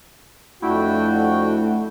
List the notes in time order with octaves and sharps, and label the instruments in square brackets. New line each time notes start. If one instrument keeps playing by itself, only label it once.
[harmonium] F2 F#4 G5 [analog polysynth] A3 D4 E4